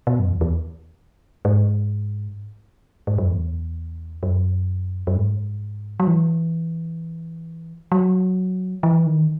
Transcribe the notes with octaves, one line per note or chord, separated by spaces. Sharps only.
B2
F#2
E2
E2
G#2
G#2
F#2
E2
F#2
F#2
G#2
F#3
E3
F#3
E3
D#3